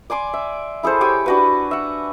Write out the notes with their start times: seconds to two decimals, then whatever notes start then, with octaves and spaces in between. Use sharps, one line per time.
0.10 D5 G#5 C6 D6
0.33 E5
0.83 E4 G#4 A4 C5
1.01 G4 C#5 G5 G#5
1.26 D4 F#4 B4
1.71 E5 F#5